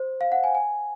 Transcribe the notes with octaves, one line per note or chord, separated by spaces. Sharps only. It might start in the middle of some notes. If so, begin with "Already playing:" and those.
Already playing: C5
F5
F#5
G#5
G#5